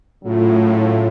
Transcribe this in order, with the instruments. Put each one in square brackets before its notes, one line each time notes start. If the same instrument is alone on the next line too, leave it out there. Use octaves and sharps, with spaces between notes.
[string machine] A2 [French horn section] C#3 F#3 A3 F4